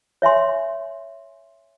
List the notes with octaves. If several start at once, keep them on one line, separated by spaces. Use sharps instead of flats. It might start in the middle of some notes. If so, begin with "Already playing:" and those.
C#5 E5 G#5 C6